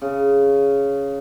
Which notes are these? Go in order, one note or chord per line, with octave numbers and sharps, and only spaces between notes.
C#3